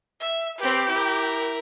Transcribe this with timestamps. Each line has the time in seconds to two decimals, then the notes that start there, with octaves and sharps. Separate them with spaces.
0.21 E5
0.58 C4 G4 B4
0.89 E4 A#4